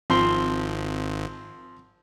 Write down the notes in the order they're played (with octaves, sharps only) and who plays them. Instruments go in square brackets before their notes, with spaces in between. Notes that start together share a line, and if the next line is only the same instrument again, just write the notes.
[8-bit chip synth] G#1 [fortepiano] F3 C4 C6